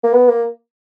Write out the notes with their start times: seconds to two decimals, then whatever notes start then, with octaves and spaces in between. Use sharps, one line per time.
0.04 A#3
0.13 B3
0.29 A#3